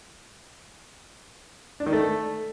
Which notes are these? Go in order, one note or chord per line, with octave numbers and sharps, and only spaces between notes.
D4
D#3
A3